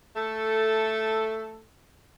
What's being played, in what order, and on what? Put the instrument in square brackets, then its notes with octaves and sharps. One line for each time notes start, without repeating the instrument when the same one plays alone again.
[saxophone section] A3 A4